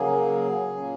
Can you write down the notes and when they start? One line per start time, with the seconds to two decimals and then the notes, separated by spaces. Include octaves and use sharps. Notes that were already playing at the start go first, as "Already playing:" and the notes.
Already playing: C#3 F#3 A#3 G#4
0.75 A#2 A#3 C#4